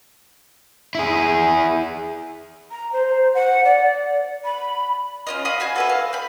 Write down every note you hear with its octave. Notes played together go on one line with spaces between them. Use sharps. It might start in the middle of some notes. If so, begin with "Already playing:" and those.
E4 G#4
A#5
C5
F#5
D5
B5
C#4 F4 D#5
D#5 F5 B5
F#4 C5 G#5
A4 B4 E5
F5
G5 B5